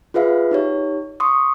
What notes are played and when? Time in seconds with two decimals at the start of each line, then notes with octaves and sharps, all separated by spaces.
0.14 F4 G#4 B4 E5 F5
0.51 D#4 G4 C#5
1.20 C6 C#6 D#6